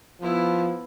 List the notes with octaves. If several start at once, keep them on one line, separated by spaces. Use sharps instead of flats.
F3 B3 E4